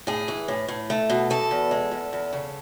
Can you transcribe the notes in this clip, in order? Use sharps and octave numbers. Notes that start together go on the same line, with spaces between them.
A2 G#4
E3
A2
A2
A3
B2
B2 A4
E2
G#3
E2
E2
C#3